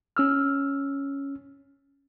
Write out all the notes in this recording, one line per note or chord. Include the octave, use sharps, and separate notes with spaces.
C#4 E6 F6